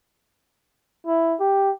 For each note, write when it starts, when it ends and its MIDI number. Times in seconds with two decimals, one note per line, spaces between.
1.07 1.35 64
1.40 1.70 67